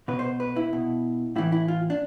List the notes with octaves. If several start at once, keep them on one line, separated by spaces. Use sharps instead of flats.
B2 B4
C5
B4
E4
B2
A2 E3 E4
E4
F4
D4